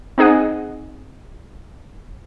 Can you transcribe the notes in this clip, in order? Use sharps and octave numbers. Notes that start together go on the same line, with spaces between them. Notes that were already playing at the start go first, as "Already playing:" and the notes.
C4 D#4 G#4 D#5 F#5